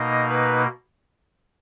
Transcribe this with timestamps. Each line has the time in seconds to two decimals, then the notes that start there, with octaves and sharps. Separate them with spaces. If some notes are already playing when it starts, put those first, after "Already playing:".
Already playing: B2 A#3 D#4 D#5
0.29 B4